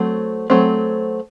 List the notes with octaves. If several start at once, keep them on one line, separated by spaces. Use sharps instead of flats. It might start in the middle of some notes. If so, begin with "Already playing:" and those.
Already playing: F#3 A3 C4
F#3 A3 C4